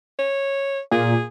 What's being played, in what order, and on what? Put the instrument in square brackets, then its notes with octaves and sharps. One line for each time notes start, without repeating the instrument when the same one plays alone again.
[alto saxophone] C#5
[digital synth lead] A#2 [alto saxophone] G#4